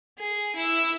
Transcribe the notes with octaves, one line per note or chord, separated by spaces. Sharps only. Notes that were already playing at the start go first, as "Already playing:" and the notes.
G#4
E4 E6